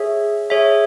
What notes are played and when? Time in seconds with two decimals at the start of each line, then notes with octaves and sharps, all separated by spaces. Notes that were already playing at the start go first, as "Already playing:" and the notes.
Already playing: G#4 C#5 E5
0.50 G#4 C#5 E5